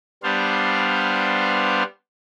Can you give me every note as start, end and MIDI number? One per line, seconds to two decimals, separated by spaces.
0.23 1.83 55
0.23 1.83 59
0.23 1.83 62
0.23 1.83 72
0.23 1.83 77